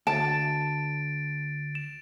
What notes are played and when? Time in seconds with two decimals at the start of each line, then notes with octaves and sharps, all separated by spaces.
0.07 D2 A5 A6 D7
1.75 E7